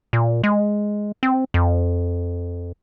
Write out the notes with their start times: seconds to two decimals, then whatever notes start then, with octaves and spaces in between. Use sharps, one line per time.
0.13 A#2
0.43 G#3
1.23 C4
1.54 F2